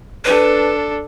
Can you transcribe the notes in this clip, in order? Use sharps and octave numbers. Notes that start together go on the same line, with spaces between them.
D4 A4 B4